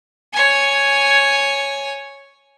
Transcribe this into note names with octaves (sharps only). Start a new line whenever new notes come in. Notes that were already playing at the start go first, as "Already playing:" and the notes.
C#5 G#5